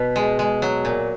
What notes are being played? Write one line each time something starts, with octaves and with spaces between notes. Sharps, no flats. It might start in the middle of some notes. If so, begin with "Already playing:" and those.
Already playing: B2 B4
G#3
G#3
F#3
A#2